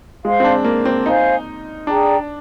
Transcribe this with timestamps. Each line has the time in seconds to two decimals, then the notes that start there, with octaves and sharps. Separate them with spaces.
0.24 G#3 C5 F5 C6
0.40 C4
0.44 D4
0.64 A#3
0.85 C4
1.05 D#4 C5 F5 G#5
1.87 D4 G#4 D5 G5 A#5